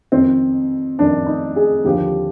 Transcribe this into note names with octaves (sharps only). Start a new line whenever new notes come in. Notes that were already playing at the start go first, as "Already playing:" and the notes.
F2 D#3 C4
F2 D#3 D4
D#4
G#4
D#2 D3 F3 G4